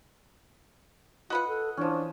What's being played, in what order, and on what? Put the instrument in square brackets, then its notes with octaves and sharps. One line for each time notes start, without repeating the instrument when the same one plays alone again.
[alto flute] F4 [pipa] F#4 B4 F#5 [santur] D#5
[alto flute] A4
[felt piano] E3 [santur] F3 C#4 [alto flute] D4